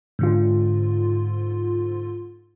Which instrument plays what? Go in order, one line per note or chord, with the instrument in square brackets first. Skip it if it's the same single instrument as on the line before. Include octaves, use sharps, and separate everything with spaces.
[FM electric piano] G#2 D3 F4